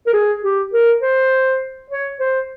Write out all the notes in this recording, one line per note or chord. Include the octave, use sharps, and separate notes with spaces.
A#4
G#4
G4
A#4
C5
C#5
C5